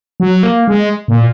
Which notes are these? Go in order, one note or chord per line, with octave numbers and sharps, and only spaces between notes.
F#3
A#3
G#3
A#2